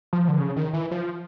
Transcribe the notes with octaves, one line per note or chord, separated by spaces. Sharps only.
F3
D3
C#3
D#3
E3
F3